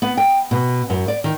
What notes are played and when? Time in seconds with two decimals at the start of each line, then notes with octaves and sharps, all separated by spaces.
0.02 B3
0.17 G5
0.51 B2
0.90 F#2
1.08 D5
1.24 D#3